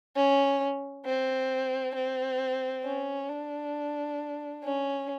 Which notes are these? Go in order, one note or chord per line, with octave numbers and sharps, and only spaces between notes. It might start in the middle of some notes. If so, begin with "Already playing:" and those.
C#4
C4
C4
C#4
D4
C#4